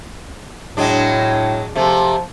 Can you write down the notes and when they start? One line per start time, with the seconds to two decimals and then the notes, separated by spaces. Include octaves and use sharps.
0.77 A2 F#3 G#3 D4
1.75 C3 F3 A3